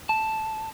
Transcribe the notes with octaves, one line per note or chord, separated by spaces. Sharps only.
A5